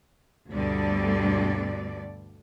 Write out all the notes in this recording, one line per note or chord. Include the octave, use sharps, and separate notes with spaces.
D2 G2 B2 D3 G3 D5